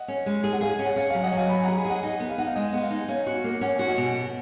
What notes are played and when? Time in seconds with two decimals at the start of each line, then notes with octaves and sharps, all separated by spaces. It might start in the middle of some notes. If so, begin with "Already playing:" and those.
Already playing: D#5 F#5
0.08 C#4
0.26 G#3
0.43 G#4 G#5
0.53 F#5
0.61 G#4 F5 G#5
0.79 C#4
0.85 F#5
0.96 C#4 F5
1.10 F5
1.15 F#3
1.23 D#5 F#5
1.32 F#3 F5 G#5
1.49 C#4 G#5 B5
1.63 G#4 F#5 A#5
1.75 G#5 B5
1.85 G#4 D#5 F#5
2.02 D#4 D#5 F#5
2.20 B3
2.30 F5
2.38 D#4 F#5
2.47 F5
2.55 G#3 D#5
2.73 B3 F#5
2.83 F5
2.91 D#4
3.08 C#4 F5
3.27 F#4
3.44 A#3
3.61 C#4 F#5
3.75 F#4 G#5
3.87 D#5 F#5
3.97 B2
4.14 B3